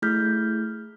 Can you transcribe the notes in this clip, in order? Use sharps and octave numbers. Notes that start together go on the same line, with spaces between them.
A3 E4 G#4 F6 G6 B6